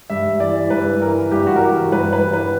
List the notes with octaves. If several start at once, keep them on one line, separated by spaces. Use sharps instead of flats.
G2 E5
G2
E3 D5
E3
G2 B4
G2
E3 A#4
E3
G2 G4
G2 F#4
A#4
E3 G4
E3 A#4
G2 B4
G2
B4
E3
E3 B4